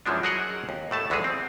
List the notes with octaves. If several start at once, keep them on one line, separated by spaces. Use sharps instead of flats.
F#2 E3 F3 G#3 D4
F#3 F#4 G#4 A#4 D#5 F#5
D#2
A2 A3 A5
D2 E3 F#3 G#3 G#4
C4